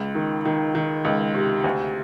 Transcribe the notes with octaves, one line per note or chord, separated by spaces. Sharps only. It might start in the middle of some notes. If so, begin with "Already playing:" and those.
Already playing: C#2
D#3
D#3
D#3
C#2
C3
D2